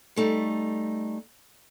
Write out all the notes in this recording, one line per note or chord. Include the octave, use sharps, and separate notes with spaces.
G3 A3 D#4